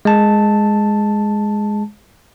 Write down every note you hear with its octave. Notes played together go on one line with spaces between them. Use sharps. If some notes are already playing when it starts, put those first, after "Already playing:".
G#3 A5